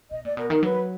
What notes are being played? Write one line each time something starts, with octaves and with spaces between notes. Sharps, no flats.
B2 D#5
A#2 D5
B2 A#4
D#3 A#4
F#3 B4